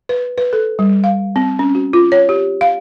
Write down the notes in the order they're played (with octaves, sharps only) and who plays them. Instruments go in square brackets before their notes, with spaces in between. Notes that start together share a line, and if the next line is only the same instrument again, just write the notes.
[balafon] B4
B4
A4
G3
F5
C4
C#4
F#4
F4
C#5
G4
F5